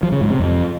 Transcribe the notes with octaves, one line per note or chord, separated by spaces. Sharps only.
F3
C#3
G#2
C3
F2